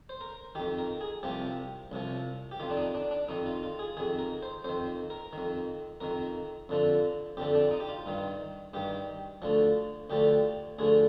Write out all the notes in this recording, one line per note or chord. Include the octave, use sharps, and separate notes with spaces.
C5
A#4
F2 D#3 G4
A#4
G#4
C2 C3 F3 G4
C2 C3 F3
G4
F2 D#3 F4
D4
D#4
D4
D4
F2 D#3 D#4
F4
F4
G#4
F2 D#3 G#4
A#4
C5
F2 D#3 C5
A#4
D#3
F2
F2 D#3 A#4
F2 D3 F3
F2 D3 F3 G4
D4
D#4
G4
F4
G2 D#3
G2 D#3 G4
D2 D3 F3
D2 D3 F3 G4
D2 D3 F3 G#4